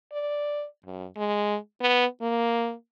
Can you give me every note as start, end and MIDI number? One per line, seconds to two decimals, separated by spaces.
0.12 0.65 74
0.86 1.06 42
1.17 1.57 56
1.81 2.05 59
2.21 2.74 58